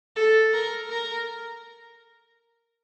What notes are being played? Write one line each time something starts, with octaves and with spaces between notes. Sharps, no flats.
A4
A#4
A#4